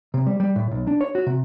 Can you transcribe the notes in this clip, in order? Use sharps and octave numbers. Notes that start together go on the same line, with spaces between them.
C3
G3
G3
A2
B1
D4
C#5
F#4
C3